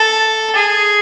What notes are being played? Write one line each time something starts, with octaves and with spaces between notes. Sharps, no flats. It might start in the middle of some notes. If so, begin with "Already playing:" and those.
Already playing: A4
G#4